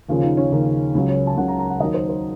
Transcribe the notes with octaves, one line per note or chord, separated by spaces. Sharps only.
D#2 C#3 F3 F4
D#4
C#4
D#2 C#3 F3 D#4
C#2 C#3 F#3
C#5
A5
C#2 C#3 F#3 F#5
A#5
A#5
F#5
D#2 D#3 F#3 D#5
C5
C5